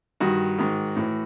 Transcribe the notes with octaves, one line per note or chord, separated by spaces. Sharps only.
G2 D#3 F#4
G#2 D#3
A2 E3